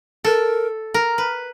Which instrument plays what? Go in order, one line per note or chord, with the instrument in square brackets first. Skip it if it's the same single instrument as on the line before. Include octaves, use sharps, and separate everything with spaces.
[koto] A4 [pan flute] A#4
[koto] A#4
B4